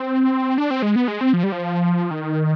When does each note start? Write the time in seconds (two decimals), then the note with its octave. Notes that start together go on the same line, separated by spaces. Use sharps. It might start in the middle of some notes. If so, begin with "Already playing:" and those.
Already playing: C4
0.58 D4
0.71 C4
0.82 G#3
0.96 B3
1.08 G#3
1.21 C4
1.33 F3
1.43 G3
1.52 F3
2.11 D#3